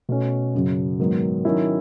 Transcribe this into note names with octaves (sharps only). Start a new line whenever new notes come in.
B2 A3 C#4
F#2 C#3 F#3
G#2 D#3 F#3 B3
D#3 F#3 C#4 E4